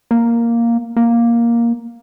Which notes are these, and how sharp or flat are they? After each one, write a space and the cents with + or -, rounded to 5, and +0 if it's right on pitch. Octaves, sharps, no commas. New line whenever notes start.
A#3 +0
A#3 +5